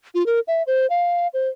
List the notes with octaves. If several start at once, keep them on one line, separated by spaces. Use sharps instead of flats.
F4
A#4
E5
C5
F5
C5